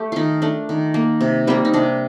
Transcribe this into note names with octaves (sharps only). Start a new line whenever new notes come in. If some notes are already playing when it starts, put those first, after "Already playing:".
Already playing: A3 G4
D#3 D#4 F4
A3 D4
D#3
A#3
C3
G3 A#3 C4
D#4
C3 D4